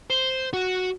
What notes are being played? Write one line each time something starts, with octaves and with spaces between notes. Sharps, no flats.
C5
F#4